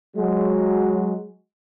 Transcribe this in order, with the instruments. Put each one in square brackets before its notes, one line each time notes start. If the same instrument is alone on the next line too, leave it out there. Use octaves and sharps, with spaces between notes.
[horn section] F#3 G#3